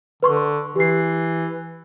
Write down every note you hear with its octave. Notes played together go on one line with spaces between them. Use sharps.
D3 B4 C6 C#6
E3 G4 C7